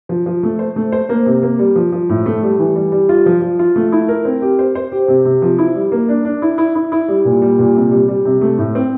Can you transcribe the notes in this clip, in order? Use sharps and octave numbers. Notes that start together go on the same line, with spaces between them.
F3
F3
A3
C5
A3
C5
A#3
C3
A#3
G3
F3
F3
A2
A3
G3
E3
G3
G3
F4
F3
F3
F4
A3
E4
A#4
C4
G4
C5
C5
G4
C3
C3
F3
E4
G3
A#3
D4
D4
E4
E4
E4
E4
G3
A#2
G3
A#2
C3
G3
G3
C3
A3
A2
C4